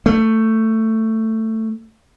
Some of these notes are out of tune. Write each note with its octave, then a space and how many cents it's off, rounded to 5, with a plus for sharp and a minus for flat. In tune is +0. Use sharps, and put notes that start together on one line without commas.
A3 +15